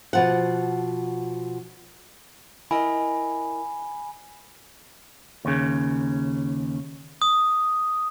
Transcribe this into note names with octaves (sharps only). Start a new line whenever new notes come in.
B2 F3 F#5
E4 A#4 D#5 G#5 B5
D#2 C#3
D#6